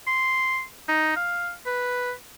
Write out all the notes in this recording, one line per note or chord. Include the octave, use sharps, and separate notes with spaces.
C6
D#4
F5
B4